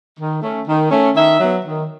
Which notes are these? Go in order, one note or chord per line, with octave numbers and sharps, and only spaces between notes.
D#3
A3 C#4
D#3
A3 C#4
D#3 E5
F#3 B3
D#3